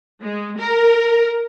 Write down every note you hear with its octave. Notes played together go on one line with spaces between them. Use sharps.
G#3
A#4